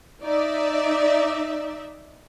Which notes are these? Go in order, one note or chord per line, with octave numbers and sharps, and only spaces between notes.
D#4 D5 E5